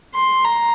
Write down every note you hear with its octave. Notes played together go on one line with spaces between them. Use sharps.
C6
A#5